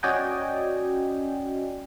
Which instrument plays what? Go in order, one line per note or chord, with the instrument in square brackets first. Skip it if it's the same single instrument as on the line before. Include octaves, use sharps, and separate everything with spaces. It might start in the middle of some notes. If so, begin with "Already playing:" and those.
[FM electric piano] C#4 F#4 D5 D#5 G5 G#5